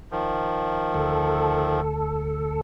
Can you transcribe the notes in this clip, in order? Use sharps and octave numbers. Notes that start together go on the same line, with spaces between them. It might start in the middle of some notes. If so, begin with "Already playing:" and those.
D#3 F3
D2 A4